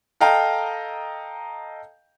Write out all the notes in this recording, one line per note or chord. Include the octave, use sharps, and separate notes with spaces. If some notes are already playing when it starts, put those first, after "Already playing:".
A4 D#5 F5 G5 A#5